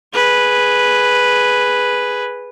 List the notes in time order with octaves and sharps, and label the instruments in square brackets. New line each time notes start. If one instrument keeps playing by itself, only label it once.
[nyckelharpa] G#4 B4